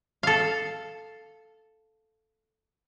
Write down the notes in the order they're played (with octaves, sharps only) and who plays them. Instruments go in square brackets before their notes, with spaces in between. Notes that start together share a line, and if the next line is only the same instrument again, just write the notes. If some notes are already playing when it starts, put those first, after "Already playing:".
[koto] A4 F5